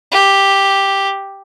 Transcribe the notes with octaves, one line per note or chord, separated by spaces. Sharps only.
G4